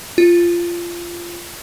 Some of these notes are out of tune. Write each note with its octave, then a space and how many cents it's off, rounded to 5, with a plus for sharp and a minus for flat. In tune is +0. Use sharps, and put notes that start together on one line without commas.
F4 -15